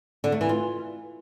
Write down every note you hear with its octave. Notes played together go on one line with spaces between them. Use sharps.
D3
A3
E3
F4